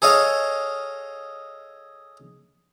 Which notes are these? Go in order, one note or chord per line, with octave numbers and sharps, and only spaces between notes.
G#4 A4 C#5 D#5 F5